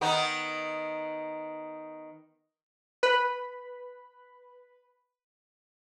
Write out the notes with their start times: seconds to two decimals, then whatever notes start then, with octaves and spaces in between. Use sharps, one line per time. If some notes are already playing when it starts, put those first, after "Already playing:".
0.01 D#3 B3 D#4
3.03 B4 B5